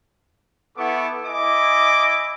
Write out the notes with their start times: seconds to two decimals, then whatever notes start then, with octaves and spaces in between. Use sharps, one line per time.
0.77 B3 E4 A4 F#5 C#6 D6
1.26 E4 D#5 G#5 D6